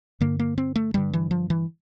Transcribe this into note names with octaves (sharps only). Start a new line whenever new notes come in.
G2 D3 A#3
A#3
C4
A3
G2 D3 G3
E3
F3
E3